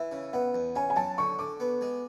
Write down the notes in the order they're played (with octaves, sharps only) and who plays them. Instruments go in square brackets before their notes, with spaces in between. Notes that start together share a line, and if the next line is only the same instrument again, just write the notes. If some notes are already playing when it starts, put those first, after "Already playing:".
Already playing: [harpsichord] E3 [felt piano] E5
[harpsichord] C#3
[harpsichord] B3 [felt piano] F#5
[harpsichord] E2
[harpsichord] C#4 [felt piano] G#5
[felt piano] G#5
[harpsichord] F#3 [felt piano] A5
[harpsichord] D3 [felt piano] C#6
[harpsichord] D3 [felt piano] D6
[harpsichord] B3
G#3